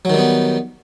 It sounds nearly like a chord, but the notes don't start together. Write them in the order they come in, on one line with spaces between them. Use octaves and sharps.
F#3 D#3 G3 B3